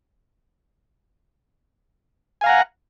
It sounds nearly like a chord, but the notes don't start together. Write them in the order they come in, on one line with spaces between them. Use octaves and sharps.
G#5 F5 A#5 F#5